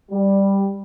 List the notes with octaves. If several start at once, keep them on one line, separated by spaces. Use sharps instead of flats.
G3